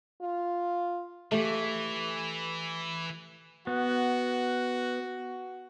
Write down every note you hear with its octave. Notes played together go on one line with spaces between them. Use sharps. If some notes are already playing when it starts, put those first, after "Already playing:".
F4
E3 A3 G4
B3 F#4